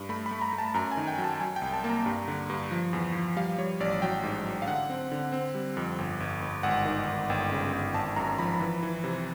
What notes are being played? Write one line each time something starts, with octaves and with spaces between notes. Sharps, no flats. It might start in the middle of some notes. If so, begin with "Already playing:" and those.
Already playing: G2
A3 B5
B5
A3
A#5
A3
A5
F#2 A#5
G#5
D#3
G5
F#3
A5
F#3 G#5
G5
C2
A5
A#3
A#5
G2
D3
G2
F3
E2
F3
G3 F5
G3 C#5
A1 D5
F#3 G5
G#2
F#3
F5
D3 F#5
C4
D3
C4
G3
F2
G1
G1
G1
G#1 F#5
D#3
G#1
G1 G5
C#3
G1
G#1 A5
F#2 A#5
F3 B5
E3
E3
C3